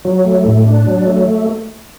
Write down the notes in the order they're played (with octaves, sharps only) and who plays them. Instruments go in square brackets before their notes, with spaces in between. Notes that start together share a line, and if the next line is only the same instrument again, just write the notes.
[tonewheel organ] F#3
A3
A2
D4
F#3
A3